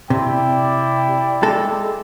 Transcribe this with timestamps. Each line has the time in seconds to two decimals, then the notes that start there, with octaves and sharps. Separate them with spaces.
0.10 C3 E4 D5 G5
1.43 G#3 A4